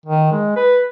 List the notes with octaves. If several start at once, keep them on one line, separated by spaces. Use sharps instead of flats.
D#3
G#3
B4